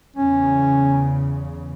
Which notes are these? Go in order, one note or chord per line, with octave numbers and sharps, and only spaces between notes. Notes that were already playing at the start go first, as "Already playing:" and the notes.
E2 C#3 C#4